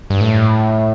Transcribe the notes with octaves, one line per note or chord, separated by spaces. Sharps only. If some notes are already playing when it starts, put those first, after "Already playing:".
G2
A2